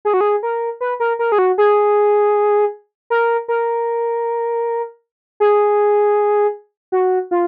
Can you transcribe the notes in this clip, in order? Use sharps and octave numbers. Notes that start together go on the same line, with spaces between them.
G#4
F#4
G#4
A#4
B4
A#4
A#4
G#4
F#4
G#4
A#4
A#4
G#4
F#4
F4